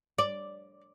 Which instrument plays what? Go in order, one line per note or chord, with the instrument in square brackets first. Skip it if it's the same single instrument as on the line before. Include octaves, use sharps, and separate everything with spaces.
[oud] D5